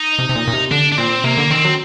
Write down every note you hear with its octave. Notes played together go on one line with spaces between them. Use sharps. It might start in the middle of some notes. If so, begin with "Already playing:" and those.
Already playing: D#4
C3
C3
A#2
A#2
C3
D3 D4
D4
A#2 C4
C3 A#3
D3
D#3 C4
F#3